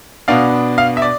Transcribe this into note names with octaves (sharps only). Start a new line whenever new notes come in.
B2 B3 D4 F5
F5
E5
D5